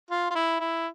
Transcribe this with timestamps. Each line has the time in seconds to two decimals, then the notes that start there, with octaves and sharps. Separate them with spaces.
0.11 F4
0.30 F4
0.35 E4
0.60 E4